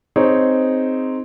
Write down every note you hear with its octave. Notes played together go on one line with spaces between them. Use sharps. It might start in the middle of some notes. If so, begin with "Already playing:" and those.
C4 D#4 G#4 C#5